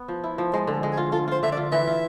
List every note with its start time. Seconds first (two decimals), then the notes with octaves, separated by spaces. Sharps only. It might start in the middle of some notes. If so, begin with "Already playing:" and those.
Already playing: B3
0.08 F3
0.24 E4
0.38 F3
0.53 G#3 C5
0.67 D3
0.73 A4
0.83 G#3
0.93 G#4
0.97 F4
1.12 F4 A4
1.28 F4 C5
1.43 D3 E5
1.52 D5
1.57 F4
1.72 E3 E5
1.87 F4